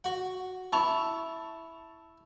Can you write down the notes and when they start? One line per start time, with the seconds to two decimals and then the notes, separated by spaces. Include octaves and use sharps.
0.04 F#4 F#5
0.73 E4 A5 C#6 F7